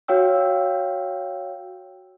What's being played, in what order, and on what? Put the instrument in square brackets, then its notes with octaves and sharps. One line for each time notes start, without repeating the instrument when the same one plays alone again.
[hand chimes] F#4 C#5 F5 G5 E6